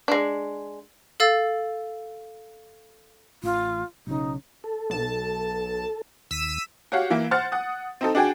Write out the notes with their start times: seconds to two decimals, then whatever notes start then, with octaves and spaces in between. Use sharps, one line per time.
0.08 G#3 D4
1.20 A4 F5 E6 A6
3.43 A1 F4
4.07 B1 C#3 D#4
4.64 A4
4.90 B1 A5
6.31 D#2 E6 B6 D#7
6.92 F#4 G4 C#5 F5 F#5
7.10 E3 A#3 E4
7.31 C5 F#5 F6 A6
7.52 F#5 D#6
8.01 C4 D#4 A4
8.15 D4 F#4 G#4 G5